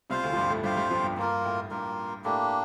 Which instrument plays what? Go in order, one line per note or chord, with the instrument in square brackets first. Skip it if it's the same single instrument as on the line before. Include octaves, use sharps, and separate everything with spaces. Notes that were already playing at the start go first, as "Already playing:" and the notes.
[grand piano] C2 C3 [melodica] F4 C5 F5
[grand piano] D2 D3
F3
G2 G3
A2 A3
[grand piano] G2 G3 [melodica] F4 C5 F5
[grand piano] G2 G3
F2 F3
G2
[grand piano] G2 [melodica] A#3 F4 A#4
[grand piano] A2
[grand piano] G2 [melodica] A#3 F4 A#4
[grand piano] A2 [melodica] A#3 D4 G4